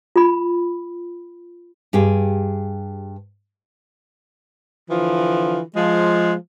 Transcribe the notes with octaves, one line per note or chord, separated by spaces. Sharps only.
F4 B5
G2 G4 G#4
D3 E3 F3 F4
F3 G#3